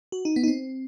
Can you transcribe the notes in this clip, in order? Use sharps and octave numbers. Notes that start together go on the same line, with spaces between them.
F#4
D#4
B3
D#4
C4